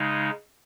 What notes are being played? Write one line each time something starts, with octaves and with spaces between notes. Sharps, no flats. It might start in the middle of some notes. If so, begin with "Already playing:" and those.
Already playing: C#3 G#3 D#4